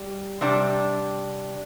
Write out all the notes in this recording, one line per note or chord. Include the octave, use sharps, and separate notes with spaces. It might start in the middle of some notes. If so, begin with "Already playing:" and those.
Already playing: G3
C3 G3 D4